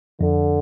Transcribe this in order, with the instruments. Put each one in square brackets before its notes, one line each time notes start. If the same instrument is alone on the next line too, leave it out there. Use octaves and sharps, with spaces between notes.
[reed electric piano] F2 [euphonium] D3